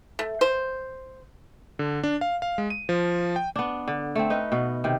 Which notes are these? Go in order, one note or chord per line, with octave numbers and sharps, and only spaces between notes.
A3
C5
D3
D4
F5
F5
G#3
D#7
F3
G5
B3 D4
D3
A3 C4
D#4 B4 D#5
B2 B3
C3 D#3